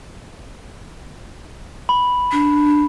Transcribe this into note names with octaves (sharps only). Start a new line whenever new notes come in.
B5
D4